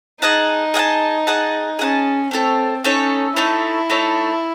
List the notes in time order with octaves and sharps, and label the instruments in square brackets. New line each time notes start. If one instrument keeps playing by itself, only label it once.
[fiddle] D#4 [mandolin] G#4 D#5 F#5 A5
[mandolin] G#4 D#5 F#5 A5
G#4 D#5 F#5 A5
[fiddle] C#4 [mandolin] G#4 D#5 F#5 A5
[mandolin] A3 D#4 A4 C#5 [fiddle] C4
[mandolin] A3 D#4 A4 C#5 [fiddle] C#4
[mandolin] A3 D#4 A4 C#5 [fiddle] E4
[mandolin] A3 D#4 A4 C#5